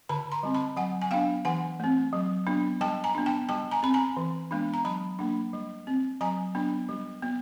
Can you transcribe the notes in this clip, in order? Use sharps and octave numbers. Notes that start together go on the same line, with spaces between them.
D3 A5 B5
A#5 C6
G3 C4
A5 B5
F#3 F#5 G#5
G#5
B3 D4 F5 G5
E3 F#5 G#5
A3 C4
F#3
B3 D4
G3 G5 A5
G#5 A#5
B3 D4
G5 A5
G3 G5 A5
G#5 A#5
C4 B5
G#5 A#5
E3
G#3 B3 D4
A#5
F#3 A5 B5
A#3 D4
G3
C4
F#3 G#5 A#5
B3 D4
G3
B3